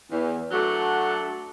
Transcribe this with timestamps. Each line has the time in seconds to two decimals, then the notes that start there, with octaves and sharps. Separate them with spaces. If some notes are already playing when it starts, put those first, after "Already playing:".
0.11 E2
0.51 F#3 A3 D4 F#4 A4 F#5